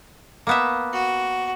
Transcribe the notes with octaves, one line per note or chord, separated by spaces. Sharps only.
A#3 B3 E5
F#4